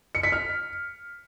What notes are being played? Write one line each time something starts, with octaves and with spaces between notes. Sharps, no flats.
C#7
B6
F6